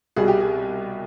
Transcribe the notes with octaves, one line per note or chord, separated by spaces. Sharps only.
C2 B2 G3 G#4
G4
G#4